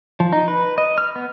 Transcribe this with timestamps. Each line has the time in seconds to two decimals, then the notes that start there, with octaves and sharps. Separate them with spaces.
0.20 F3
0.33 D#4
0.48 B4
0.78 D#5
0.98 F6
1.16 B3